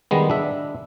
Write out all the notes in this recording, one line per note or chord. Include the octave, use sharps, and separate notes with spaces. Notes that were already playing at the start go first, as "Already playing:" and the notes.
D#3 G3 G#3 B3
D4 E5